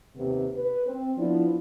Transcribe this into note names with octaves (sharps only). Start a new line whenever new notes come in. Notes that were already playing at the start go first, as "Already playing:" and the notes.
D#2 C3 B3
B4
C4
F3 B3 D4 E4